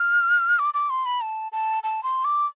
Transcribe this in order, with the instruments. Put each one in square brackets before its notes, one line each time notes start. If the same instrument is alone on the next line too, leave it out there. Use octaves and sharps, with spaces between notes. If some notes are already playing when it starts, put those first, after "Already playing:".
Already playing: [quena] F6
D6
D6
C6
B5
A5
A5
A5
C6
D6